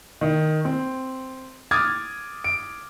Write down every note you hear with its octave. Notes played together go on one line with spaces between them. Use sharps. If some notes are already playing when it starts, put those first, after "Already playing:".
D#3
C4
D6 D#6 F6 G#6 A6
D7